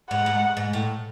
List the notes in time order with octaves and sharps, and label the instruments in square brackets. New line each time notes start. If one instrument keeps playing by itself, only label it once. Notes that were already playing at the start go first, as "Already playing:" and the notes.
[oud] G#2 [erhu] F#5
[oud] G#2
G#2
A2